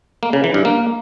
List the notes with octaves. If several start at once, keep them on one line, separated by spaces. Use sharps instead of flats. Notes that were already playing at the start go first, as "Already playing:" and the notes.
A#3
C#3
E3
G2
A#3